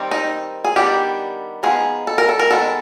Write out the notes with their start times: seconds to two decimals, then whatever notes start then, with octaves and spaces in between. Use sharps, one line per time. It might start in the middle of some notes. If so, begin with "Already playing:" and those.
Already playing: D#3 G3 C4
0.11 D#4
0.65 G#4
0.76 D#3 G3 B3 D4 G4
1.63 F3 G#3 B3 D#4 G#4
2.07 A4
2.18 A#4
2.29 A4
2.39 A#4
2.50 D#3 G#3 B3 A4